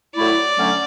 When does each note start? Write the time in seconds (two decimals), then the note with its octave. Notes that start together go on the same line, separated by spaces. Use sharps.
0.16 A2 F#3 A3 E4 D5
0.56 D3 F#3 A3 C#4